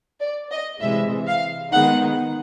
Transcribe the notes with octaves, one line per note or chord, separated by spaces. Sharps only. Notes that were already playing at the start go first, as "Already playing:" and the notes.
D5
D#5
C3 E3 G#3 E5
F5
D#3 G#3 B3 D#4 F#5